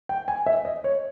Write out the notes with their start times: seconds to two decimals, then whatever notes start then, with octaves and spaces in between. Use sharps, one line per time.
0.09 G5
0.28 G#5
0.46 E5
0.65 D#5
0.84 C#5